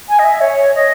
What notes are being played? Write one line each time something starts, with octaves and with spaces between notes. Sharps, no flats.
G#5
D#5
E5
C#5
D#5